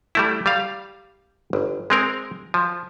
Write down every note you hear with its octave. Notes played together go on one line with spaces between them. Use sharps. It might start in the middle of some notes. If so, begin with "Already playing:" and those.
G3 A3 E4
G3 F5
G1
G#3 C4 A#4
F3